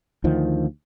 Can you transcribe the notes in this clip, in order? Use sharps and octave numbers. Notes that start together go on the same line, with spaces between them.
D2 D#3 F3